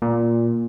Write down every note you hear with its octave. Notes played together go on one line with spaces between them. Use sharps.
A#2